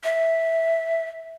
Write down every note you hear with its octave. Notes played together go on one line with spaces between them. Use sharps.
E5